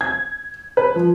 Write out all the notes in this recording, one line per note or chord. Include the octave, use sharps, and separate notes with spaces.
G#6
B4
F3